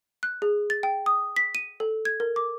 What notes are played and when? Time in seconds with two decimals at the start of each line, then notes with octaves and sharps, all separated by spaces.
0.23 F#6
0.42 G#4
0.70 A6
0.83 G5
1.06 D#6
1.36 B6
1.55 D#7
1.80 A4
2.05 G#6
2.20 A#4
2.36 D6